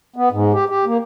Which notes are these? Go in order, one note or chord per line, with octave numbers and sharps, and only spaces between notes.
B3
G#2
G4
G4
A#3